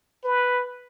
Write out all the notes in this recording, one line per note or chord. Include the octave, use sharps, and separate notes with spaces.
B4